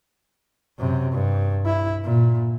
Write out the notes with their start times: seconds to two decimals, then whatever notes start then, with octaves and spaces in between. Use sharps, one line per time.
0.79 F#2 C3
1.12 G2
1.66 E4
2.04 A#2